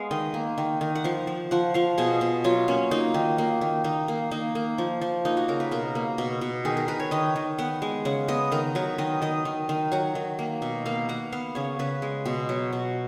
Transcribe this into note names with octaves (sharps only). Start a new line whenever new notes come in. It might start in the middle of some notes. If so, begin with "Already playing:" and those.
Already playing: G#3 B3 F5
D#3 D#5
A#3
D#3
D#3
F#5
F3 F5
F3
F3 F#5
F3 F5
B2 G#4
B2
F#3 F4
A#3 C#4
A#3 D#4
D#3
A#3
D#3
D#3 D#4
A#3
A#3 D#4
A#3
F3
F3
A#3 D#4
F#4
C#3 A#4
B4
B2 A#4
A#3
B2
B2
D#3 G#4
A#4
D#3 B4
C#5
D#3 D#5
D#3
B3 F#5
G#3
C#3 F#5
B3 D#5
D#3 A#4
F#3 B4
D#3 D#5
D#3 D#5
D#3
D#3
F#3 F#5
D#3
A#3
B2
A#3 F5
A#3 F#5
B3 F5
C#3 C#5
C#3 B4
G#3
B2
F#3
B2